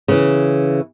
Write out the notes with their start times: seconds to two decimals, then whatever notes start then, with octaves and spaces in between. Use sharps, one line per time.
0.08 C#3 E3